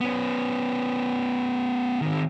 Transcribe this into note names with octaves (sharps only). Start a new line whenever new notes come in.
B3 C#4
D#3 C4